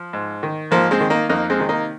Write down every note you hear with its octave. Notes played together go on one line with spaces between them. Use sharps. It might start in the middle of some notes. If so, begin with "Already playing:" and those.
Already playing: F3
G#2
D#3
G#2 F3 A#3
G#3 C4
D#3
A#3 D#4
F2 A#3 D#4
G#3 C4
C3 D#3
A#3 D#4